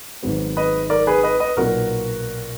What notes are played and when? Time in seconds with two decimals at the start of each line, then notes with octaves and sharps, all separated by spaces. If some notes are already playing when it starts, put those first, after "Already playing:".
0.23 G#1 G#2 F#3 B3
0.57 B4 D#5
0.90 A#4 D5
1.07 G#4 B4
1.23 B4 D#5
1.40 B4 D#5
1.57 B1 A#2 F#3 B3 F#4 A#4